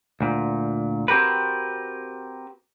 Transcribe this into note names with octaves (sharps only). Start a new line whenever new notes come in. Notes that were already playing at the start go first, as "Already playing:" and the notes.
D2 A#2
C4 F#4 G4 A#4 B4